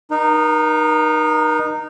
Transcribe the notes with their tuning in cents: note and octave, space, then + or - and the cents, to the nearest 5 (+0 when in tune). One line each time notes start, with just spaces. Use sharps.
D#4 -15 A#4 +35